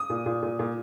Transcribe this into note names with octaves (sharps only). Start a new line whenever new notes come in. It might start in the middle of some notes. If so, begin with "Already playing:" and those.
Already playing: D#6
A#2
A#2
A#2
A#2